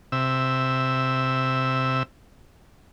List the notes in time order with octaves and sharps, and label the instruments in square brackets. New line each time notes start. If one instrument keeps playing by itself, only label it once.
[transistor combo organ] C3 E5